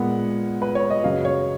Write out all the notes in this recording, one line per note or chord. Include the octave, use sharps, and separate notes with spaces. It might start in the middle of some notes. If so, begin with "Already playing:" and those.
Already playing: A#2 G#3 B3 F#5
B4
C#5
D#5
F#2 C#3 F#3 F5
C#5